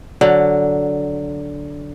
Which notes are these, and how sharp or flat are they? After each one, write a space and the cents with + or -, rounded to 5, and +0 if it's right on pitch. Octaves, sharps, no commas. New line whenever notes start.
D3 -10 F#3 +0